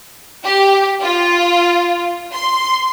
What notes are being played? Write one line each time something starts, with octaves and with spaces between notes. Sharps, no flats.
G4
F4
C6